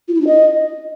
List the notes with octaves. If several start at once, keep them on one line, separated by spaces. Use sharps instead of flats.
F4
E4
D4
D#5